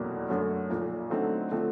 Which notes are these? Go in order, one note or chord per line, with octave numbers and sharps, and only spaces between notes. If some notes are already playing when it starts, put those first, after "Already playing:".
Already playing: F1 E2 B2 F#3 A#3
F#2 D3 F#3 A3 C#4
B1 A#2 F3
D3 F#3 A3 C4 D#4
D3 F3 A3 C4